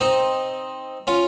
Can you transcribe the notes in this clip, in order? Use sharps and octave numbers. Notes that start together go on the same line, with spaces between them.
C4 D#4
C#4 F4